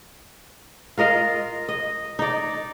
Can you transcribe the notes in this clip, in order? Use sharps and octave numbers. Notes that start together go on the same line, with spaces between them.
F4 A#4 D#5 F5
D#5
D#4 D5